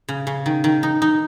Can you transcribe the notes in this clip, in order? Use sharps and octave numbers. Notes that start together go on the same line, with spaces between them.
C#3
C#3
D#3
D#3
D#4
D#4